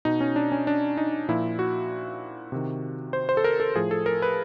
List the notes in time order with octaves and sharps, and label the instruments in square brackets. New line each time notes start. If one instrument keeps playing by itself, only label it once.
[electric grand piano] B2 D#4
C#4
D4
C#4
D4
D#4
A#2 F3 E4
F#4
C3 D#3
C5
C5
A4
A#4
A4
A2 F3 G#4
A4
A#4
B4